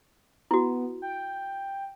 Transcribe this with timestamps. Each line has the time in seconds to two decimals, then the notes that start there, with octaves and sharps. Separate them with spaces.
0.51 B3 E4 F#4
1.02 G5